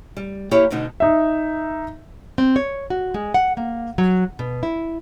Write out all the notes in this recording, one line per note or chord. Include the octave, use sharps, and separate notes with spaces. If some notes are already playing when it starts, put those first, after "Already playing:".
G3
A#3 E4 G4 C#5
D2 B2 D3 D#4
D#4 E5
C4
C#5
F#4
G#3
F#5
A#3
F#3
B2
E4